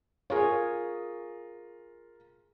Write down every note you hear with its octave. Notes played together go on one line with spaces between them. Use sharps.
F4 G#4 A#4 C#5